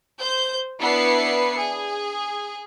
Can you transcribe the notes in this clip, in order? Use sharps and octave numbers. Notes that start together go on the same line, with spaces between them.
C5 G6
B3 D4 E4 B4 C7 C#7
G#4